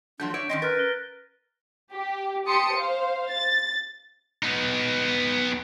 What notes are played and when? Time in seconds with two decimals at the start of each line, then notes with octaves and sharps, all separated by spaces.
0.20 F3 F#3 A3 D4 G6
0.34 C#5 D5 E5 D7
0.49 D#3 F3 C4 C#4 D#5 A#6 B6
0.62 A#4 B4 F6 G6 A6
0.77 A#6 G7
1.92 G4
2.46 G4 A5 C6 D#6 C#7
2.75 C5 F5
3.29 A6
4.43 B3 D#4